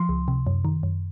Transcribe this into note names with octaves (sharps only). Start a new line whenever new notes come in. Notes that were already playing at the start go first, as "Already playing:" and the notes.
Already playing: F3 C6
C#2
C3
F#2
D#3
F#2